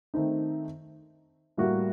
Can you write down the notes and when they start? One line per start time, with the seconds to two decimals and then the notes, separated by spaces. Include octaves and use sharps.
0.14 D#3 A3 C4 D#4
1.57 A2 G3 A#3 F#4